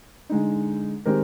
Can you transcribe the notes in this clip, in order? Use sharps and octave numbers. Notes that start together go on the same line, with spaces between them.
D3 G#3 D#4
D#3 G#3 C4 G4 A#4